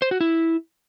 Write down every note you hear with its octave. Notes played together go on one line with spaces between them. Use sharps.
C5
F#4
E4